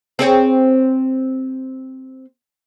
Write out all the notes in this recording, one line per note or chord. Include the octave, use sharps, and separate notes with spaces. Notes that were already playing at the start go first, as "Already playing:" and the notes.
C4 G#4 C#5